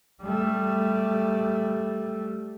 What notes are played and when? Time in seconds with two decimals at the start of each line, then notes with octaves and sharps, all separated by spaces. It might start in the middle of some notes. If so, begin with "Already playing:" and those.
0.23 G3 A3